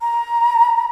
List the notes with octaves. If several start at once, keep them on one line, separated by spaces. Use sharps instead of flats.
A#5